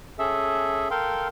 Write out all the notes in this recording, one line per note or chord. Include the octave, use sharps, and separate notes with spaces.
C#4 G#4 A4 E5
A4 A#4 F5 G5 C6